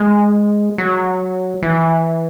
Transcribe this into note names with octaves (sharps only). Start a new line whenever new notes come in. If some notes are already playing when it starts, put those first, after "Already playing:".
Already playing: G#3
F#3
E3